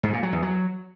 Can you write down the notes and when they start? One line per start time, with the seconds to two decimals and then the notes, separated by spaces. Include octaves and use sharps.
0.03 G#2
0.13 A#2
0.23 F#3
0.33 E2
0.42 F#3